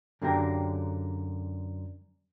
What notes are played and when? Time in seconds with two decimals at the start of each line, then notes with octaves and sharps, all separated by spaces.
0.22 F#2 D3 A#3 G4 A#4 G5